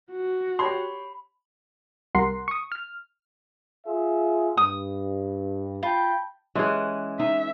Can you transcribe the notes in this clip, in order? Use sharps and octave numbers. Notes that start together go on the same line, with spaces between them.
F#4
G4 C#5 B5 C6
C2 G3 A#4 F#5 C6
C#6 D#6
F6
F4 G#4 E5
G2 D#6
F4 G5 A5 B5
E3 G#3 C#4 G#4
D#4 E5